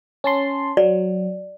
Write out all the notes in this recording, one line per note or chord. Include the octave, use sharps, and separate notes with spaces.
C#4 A5 C6
F#3 D5